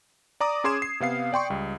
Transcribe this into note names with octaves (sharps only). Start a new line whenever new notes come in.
D5 A#5 D6 D#6
C#4 G#4 C6 D6 G#6 E7
C7
C3 B3 F5 C7
D5 G5 C6 C#6
C#2 G3